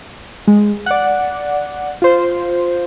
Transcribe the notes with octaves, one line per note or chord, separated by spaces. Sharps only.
G#3
D5 F#5
F4 C5